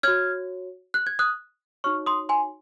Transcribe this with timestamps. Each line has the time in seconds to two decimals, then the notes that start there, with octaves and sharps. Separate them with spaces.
0.03 F#4 C#5 F6 G#6
0.94 F#6
1.07 G#6
1.19 D#6 F#6
1.84 D#4 F#4 C#5 C#6 F6
2.06 C6 D#6
2.29 G#5 C6